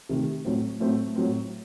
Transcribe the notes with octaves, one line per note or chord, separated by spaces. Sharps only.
C3 D#3 A3
A2 F#3 A3 C4
A2 F#3 A3 C4
A2 F#3 A3 C4